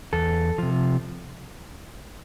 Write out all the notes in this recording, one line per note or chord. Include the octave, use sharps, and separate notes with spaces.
E2 A4
C3 F3